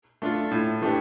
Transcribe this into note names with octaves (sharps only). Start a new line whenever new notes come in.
A3 D4 F4
A2
E3 A3 D4 G4